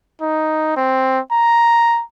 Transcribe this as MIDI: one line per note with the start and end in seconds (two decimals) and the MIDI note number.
0.22 0.74 63
0.77 1.19 60
1.33 2.03 82